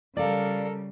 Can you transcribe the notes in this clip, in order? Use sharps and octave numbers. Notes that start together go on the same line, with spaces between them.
C#3 G3 A4 A#4 D5 F5